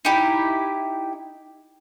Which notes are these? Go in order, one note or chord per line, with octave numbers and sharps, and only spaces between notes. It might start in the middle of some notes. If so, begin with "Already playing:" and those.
D#4 E4 G4